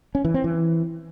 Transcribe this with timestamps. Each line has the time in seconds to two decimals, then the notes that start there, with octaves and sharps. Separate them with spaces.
0.15 C#4
0.25 E3
0.34 C4
0.44 E3